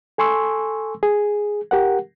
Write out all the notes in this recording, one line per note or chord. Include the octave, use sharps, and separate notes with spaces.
A4 G#5 C6 C#6 E6
G#4
G4 A#4 F#5